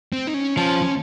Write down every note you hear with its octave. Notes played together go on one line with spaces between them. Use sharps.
C4
D#4
C#4
F3 C#4
C#4